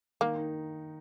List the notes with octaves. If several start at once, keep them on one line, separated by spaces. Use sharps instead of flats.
D#3 A#3
D#4